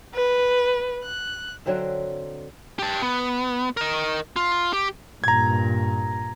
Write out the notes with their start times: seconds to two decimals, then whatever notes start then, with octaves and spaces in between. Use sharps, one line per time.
0.14 B4
1.03 F#6
1.66 D3 F#3 C4 E5
2.79 G4 A5
3.02 B3
3.77 A#4 D#5
4.36 F4
4.73 G4
5.24 G2 A#2 A#5 G#6